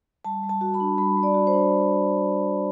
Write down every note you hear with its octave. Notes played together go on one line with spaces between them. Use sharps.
G3 A5
G3
A5
F#4
B5
D4
G3 B5
G3
D5
F#4
C5
D4